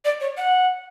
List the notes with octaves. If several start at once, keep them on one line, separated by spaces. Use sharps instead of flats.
D5
C#5
F#5